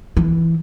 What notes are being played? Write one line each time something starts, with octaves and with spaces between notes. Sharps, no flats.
E3